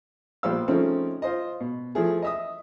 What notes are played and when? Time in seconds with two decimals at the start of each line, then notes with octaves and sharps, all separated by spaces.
0.43 A#1 G3 B3 C5 F5 E6
0.68 C#3 F3 A3 C4 C#4 D#4
1.22 F4 C5 D#5
1.61 B2
1.95 E3 F3 A3 E4 G#4
2.22 D#5 E5 D#6